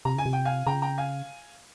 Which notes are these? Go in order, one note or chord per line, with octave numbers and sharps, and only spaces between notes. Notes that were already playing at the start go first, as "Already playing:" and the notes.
C3 A#5
C#3 G#5
C3
G5
F5 G#5
C#3 G5 A#5
G5 A#5
F5 G#5